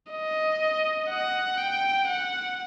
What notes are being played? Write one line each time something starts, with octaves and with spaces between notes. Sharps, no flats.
D#5
F#5
G5
F#5